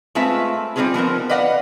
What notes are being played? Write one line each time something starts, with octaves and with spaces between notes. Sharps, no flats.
G#3 A3 C4 F4 B4 E5
G3 C4 D#4 F4 G#4 B4
F3 B3 C4 A#4
B4 D5 D#5 F5 F#5